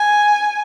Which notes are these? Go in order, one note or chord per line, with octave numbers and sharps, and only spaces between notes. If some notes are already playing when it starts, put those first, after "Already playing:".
Already playing: G#5